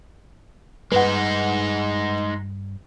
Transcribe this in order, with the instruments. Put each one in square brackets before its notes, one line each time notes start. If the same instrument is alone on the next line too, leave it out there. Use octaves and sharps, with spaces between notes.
[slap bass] G2 G3 [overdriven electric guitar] G#3 D#4 [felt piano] B4 F#5